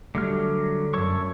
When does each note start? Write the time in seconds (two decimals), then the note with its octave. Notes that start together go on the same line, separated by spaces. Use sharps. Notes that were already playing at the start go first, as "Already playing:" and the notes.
0.15 D3 F#3 G3 A3 F6
0.94 F#2 A4 C#5 C#6